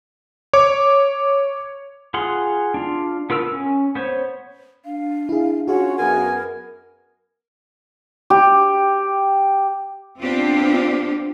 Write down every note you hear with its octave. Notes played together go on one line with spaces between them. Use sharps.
C#5 D6
F4 G#4 F#5 C6
D4 F4
B3 F4 A#4 E6
C#4
B3 C5 C#5
D4 F5
E4 G#4
C#4 F4 F#4 G#4 C#5 F#5
F#2 B3 A#4 G#5
G4
B3 C4 D4 F4 G4